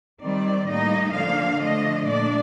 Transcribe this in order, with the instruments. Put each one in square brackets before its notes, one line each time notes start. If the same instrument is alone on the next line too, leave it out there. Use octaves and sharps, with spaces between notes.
[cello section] D#3 G3 C4 D5
A2 G3 A#3 D#4 D#5
D3 F3 A#3 D4 F5
D3 F3 A3 D4 D#5
A#2 A3 D4 D5